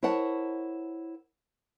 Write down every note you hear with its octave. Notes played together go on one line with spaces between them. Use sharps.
E4 A#4 C5 C#5 F#5 A5